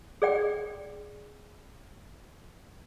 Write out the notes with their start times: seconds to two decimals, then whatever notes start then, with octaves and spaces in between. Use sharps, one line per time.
0.22 G#4 D5 G5